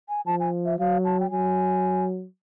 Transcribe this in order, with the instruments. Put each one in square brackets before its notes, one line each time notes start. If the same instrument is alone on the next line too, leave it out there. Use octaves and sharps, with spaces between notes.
[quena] G#5
[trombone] F3 [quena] A5
[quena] G#5
E5
[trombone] F#3 [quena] F5
[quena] A5
G5
[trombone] F#3 [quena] G#5